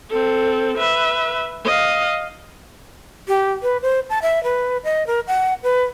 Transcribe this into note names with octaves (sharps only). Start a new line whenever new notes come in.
C4 A4
B4 E5
D#5 F5
G4
B4
C5
A5
E5
B4
D#5
A#4
F#5
B4